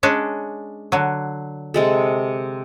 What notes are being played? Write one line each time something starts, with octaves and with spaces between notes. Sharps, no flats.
G#3 C#4 D4
D3 F#3
C3 G#3 A4